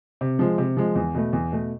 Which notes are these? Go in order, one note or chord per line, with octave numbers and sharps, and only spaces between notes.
C3
F3 G#3
C3
F3 G#3
E2
B2 A3
E2
B2 A3